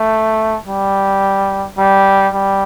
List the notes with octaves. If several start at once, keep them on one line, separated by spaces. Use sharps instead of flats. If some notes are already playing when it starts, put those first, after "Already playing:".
Already playing: A3
G3
G3
G3